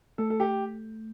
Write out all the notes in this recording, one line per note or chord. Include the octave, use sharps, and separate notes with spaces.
A3 A4
A4
G4